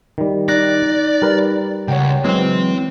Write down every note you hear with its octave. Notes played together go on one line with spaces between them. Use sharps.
D#3 G3
D#4 D5 F#6 A#6
G3 A#4 B4
C#2 C#5 F#5 G5
E3 F#3 G#3 C4 C5